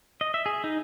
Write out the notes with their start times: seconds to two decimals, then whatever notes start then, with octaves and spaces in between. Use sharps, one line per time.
0.21 D#5
0.34 E5
0.46 G#4
0.64 D#4